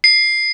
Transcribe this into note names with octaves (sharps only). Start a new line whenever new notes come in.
C7